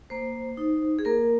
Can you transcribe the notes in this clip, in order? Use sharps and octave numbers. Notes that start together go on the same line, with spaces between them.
A#3 C5
D#4
G#4
A#3 A#4